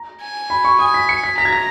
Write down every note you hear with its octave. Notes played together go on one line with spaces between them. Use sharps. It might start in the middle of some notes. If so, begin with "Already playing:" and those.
Already playing: A#5
G#5
B5
C#6
G#5 D#6
B6
C#7
B6
A#5 B6
G#6
A#6